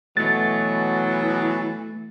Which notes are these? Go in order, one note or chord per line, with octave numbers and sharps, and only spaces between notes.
B2 E3 F#3 A3 A6